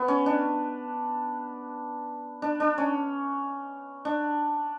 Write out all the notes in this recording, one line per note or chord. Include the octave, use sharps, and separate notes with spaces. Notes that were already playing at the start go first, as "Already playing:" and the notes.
Already playing: B3
C#4
D4
D4
D4
C#4
D4